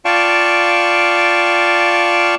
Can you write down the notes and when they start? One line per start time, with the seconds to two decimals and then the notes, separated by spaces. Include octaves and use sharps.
0.05 F4 D5 F5 G5 A5 C#6